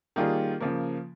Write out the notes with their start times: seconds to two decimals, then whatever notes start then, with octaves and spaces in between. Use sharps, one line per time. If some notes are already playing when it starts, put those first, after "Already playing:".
0.16 D#3 G3 A#3 F4 G#4
0.60 C#3 F3 A#3